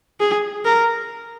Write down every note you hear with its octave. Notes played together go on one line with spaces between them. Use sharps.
G#4
A#4